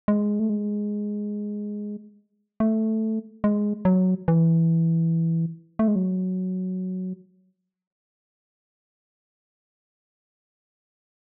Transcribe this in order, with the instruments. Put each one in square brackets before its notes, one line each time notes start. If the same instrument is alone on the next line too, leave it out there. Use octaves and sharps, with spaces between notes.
[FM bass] G#3
A3
G#3
A3
G#3
F#3
E3
A3
G#3
F#3